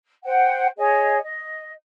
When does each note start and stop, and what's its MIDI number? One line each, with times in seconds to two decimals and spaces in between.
0.24 0.67 72
0.24 0.67 78
0.24 0.67 79
0.77 1.17 68
0.77 1.17 73
0.77 1.17 75
0.77 1.17 80
1.21 1.70 75